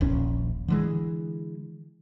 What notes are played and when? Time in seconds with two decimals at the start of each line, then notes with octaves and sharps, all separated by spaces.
0.01 D#1 A#1 C#4
0.68 D3 E3 G#3